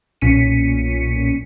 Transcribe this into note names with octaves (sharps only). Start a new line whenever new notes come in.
B1 A#2 C#4 B6 C#7 D#7